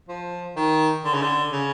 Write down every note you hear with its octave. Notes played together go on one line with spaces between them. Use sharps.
F3
D#3
D3
C#3
D3
C#3